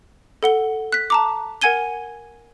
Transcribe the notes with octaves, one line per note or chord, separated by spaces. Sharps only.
A4 F#5 G7
F#6 B6
A5 A#5 D6
A#4 F#5 G#5 G#6 D#7 G7